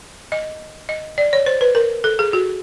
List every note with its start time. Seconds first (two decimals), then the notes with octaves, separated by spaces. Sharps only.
0.32 D#5
0.89 D#5
1.18 D5
1.33 C#5
1.46 C5
1.61 B4
1.75 A#4
2.04 A4
2.19 G#4
2.33 F#4